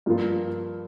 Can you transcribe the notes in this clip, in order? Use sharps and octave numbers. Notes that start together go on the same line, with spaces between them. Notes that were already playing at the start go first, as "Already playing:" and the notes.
G2 F3 A#3 F4